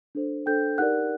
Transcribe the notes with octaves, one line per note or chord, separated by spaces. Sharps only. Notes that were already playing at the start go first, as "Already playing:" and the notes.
D4 A4 C5
D4 A4 C5 G5 G6
D#4 G4 A#4 D5 F#5 F#6